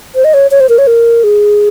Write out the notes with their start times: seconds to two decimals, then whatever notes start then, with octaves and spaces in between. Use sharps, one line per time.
0.15 C5
0.24 D#5
0.34 C#5
0.51 C#5
0.60 C5
0.69 A#4
0.78 C#5
0.87 A#4
1.24 G#4